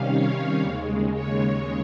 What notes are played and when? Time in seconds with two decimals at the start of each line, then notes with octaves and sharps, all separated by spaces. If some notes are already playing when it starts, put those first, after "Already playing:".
Already playing: C3 D#3 G3 C#4 F5
0.08 C#5
0.61 D#2 C#3 G#3
1.14 C#5